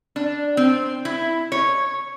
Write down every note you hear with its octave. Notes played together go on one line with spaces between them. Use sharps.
D4
C4
E4
C#5